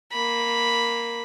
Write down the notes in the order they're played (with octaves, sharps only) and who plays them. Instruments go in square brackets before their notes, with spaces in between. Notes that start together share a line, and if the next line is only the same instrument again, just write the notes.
[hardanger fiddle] A#3 B5